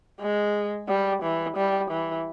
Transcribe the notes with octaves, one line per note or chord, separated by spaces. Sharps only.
G#3
G3
E3
G3
E3